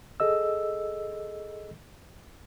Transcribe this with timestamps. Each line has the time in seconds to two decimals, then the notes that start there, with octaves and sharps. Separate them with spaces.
0.20 G#4 A4 D#5 E6